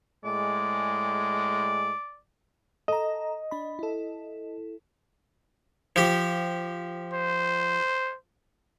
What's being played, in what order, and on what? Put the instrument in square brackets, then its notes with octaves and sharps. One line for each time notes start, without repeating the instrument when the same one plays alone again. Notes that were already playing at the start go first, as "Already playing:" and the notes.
[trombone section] A2 G#3 [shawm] D5
[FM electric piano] A4 A#5 [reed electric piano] D#5
[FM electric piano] D4 B5
E4 A4
[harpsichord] F3 G4
[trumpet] C5